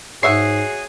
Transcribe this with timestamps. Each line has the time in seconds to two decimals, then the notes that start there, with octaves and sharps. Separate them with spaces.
0.23 G#2 F#4 G#4 C#5 E5 F#5 C7